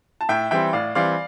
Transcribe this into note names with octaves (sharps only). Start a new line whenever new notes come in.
A5
A2 E5 G5
E3 G3 C4 E5 G5
A2 D5 F5
E3 G3 C4 D5 F5